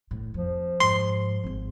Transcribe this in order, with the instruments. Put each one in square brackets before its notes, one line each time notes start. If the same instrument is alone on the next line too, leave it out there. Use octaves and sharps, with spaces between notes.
[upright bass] A2
[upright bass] F2 [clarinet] F3
[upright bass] G#2 [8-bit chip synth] C6
[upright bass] G#1 G#2